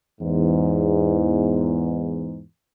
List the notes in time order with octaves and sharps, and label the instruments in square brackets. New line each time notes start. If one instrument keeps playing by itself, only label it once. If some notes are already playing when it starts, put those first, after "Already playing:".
[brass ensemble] E2 G#2